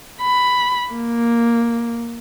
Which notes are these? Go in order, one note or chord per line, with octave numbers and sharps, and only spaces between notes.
B5
A#3